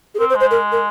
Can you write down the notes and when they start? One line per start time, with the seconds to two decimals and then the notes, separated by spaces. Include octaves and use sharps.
0.15 G#4
0.19 C4 A#4
0.30 C5
0.35 G#3
0.40 C5
0.51 A#4
0.72 A#4